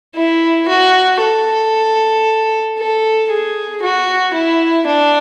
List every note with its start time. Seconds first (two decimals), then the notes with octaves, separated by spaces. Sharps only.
0.15 E4
0.68 F#4
1.21 A4
2.78 A4
3.30 G#4
3.82 F#4
4.34 E4
4.86 D4